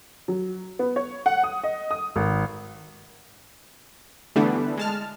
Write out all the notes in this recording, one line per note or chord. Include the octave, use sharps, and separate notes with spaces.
F#3
B3
C#5
F#5
D#6
D#5
D#6
G#1
D3 E3 G3 A3 B3 D4
G#3 A5 F6